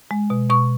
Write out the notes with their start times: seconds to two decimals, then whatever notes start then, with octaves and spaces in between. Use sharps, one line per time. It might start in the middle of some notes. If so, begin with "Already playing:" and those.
0.11 G#3
0.30 B2
0.50 B2 C#6